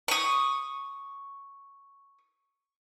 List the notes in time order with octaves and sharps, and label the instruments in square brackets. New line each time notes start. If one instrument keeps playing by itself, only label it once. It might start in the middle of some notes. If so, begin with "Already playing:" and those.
[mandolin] C#6 D#6